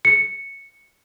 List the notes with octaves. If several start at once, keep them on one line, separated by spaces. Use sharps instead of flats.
C#7